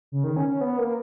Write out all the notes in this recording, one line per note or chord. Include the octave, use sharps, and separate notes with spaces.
C#3
D#3
C#4
C#4
B3
A#3